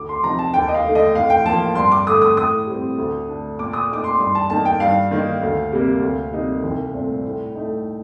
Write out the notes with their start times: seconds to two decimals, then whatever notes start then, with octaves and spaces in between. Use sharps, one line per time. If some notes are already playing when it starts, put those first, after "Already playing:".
Already playing: D2 D6
0.09 C6
0.23 C3 F3 C4 D#4 A#5
0.39 A5
0.54 D#2 G5
0.68 D#5
0.75 F5
0.85 D3 A3 D#4
0.95 D#5
1.14 A2 F5
1.30 G5
1.46 F3 A#3 A5
1.75 G2 C6
1.92 D6
2.07 D3 A3 D#6
2.22 D#6
2.36 A2 D#6
2.67 G3 C4
2.98 D2
3.29 D3 A3 D4
3.59 A#2 D6
3.73 D#6
3.89 A3 D#4 D6
4.04 C6
4.19 G2 C6
4.35 A5
4.50 D#3 A#3 D#4 A5
4.65 G5
4.80 G2 F5
5.11 D#3 A#3 D#4
5.42 D2
5.72 C3 G3 A#3
6.02 D2
6.33 C3 G3 A#3 D#4
6.63 C2
6.94 A#2 A3 C4
7.25 A2
7.55 A3 D#4